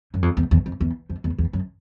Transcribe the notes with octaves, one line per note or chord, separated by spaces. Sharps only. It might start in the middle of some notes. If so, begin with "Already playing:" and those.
F#2
F2
E2
E2
F2
E2
F2
E2
E2
F#2